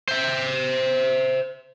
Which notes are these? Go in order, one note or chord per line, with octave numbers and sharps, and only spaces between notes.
C5 E5